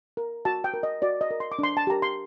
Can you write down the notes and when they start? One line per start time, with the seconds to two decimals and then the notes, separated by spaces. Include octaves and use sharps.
0.17 A#4
0.45 F#4 A5
0.64 G5
0.74 A#4
0.83 D#5
1.02 F#4 D5
1.21 D#5
1.31 A#4
1.40 C6
1.52 D6
1.59 D4 C6
1.77 A5
1.87 G4 A#4 A#5
2.02 C6